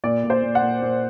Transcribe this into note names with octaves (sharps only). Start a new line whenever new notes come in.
A#2 D5
A#2
C5
A#2
F#5
A#2
A#2